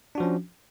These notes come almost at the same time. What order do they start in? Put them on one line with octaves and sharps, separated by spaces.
D4 F#4 F3 C#4